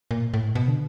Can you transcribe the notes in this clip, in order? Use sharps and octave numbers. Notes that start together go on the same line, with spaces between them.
A#2
A2
B2
D3